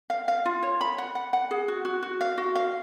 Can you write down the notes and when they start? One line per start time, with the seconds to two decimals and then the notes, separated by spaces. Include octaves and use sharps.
0.10 F5
0.28 F5
0.45 F4
0.63 C#5
0.81 B5
0.98 F#5
1.15 F#5
1.33 F#5
1.51 G#4
1.68 F#4
1.85 F#4
2.03 F#4
2.21 F5
2.38 F#4
2.55 F5